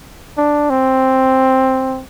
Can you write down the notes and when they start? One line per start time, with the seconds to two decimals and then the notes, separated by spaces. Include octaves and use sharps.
0.37 D4
0.70 C4